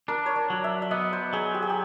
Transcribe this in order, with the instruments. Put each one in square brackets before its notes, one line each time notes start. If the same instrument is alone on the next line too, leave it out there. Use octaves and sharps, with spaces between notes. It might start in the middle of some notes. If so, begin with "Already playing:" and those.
[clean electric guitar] D4 [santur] A#4
[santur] C#5
D5
[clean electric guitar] F#3
[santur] E5
D5
[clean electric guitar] B3 [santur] D#5
[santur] C5
[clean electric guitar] F#3 [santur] G#4
[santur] G4
G#4
G4